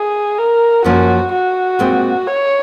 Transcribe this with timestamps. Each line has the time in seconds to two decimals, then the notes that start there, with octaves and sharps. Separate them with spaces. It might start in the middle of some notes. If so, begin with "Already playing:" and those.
Already playing: G#4
0.38 A#4
0.84 F#2 F3 A#3 C#4 F#4
1.32 F#4
1.79 A#2 G#3 C4
2.27 C#5